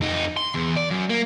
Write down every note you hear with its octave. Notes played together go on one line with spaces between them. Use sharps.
F2 D#4
C6
E2
D5
F#2
A#3